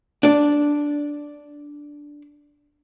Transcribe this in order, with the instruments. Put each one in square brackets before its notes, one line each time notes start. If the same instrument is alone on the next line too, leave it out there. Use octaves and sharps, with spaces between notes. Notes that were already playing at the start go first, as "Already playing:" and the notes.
[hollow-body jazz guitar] D4 D5